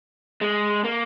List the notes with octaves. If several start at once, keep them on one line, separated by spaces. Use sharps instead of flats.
G#3
A#3